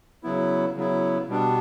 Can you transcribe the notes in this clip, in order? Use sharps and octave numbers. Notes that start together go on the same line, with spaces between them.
C#3 F#3 B3 E4
C#3 F#3 B3 E4
B2 G3 B3 D4